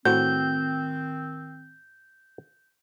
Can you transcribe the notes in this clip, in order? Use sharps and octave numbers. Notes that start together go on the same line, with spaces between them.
A2 D#3 C4 F#4 C5 G6